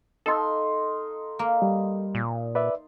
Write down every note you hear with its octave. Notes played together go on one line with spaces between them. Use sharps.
D#4 A4 F5 C6
A#3
G3
A#2
B4 D5 E5